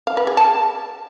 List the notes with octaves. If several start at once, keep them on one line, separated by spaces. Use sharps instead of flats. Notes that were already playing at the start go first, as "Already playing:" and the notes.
F5
B4
G#4
A5